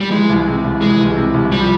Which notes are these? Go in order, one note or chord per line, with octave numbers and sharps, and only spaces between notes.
G3
E3 G#3
C2
C3
C2
E3 G#3
C2
C3
C2
F3 G3